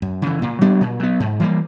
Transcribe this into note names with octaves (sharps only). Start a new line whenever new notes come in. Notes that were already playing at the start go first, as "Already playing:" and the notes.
F#2
C#3 E3
A#2
F#3 B3 D4
A#2
F#3 B3
G#2
E3 G3 A#3